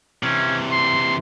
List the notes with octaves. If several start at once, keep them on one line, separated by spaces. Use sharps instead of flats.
C3 E3 C#4
C6